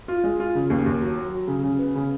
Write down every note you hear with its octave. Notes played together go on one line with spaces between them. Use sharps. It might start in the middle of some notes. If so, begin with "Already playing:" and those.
F4
G#3
F4
C#3
D#2
D#2
F#3
F#3
F#3
C#3
C#3
B3
C#3